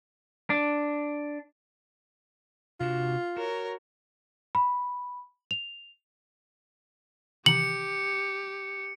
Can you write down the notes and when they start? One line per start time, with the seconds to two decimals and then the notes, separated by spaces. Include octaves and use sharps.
0.50 D4
2.80 C3 D4 F4 F#4
3.37 F#4 A#4 C#5
4.55 B5
5.51 F7
7.46 C3 D#3 E3 G4 C#7 F#7